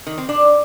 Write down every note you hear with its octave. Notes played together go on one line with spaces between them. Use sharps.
D#3
C4
D4